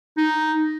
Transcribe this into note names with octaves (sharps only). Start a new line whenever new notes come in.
D#4